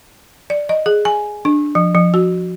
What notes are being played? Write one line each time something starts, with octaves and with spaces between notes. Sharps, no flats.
D5
D#5
G#4
G#5
D4
F3
F3
F#4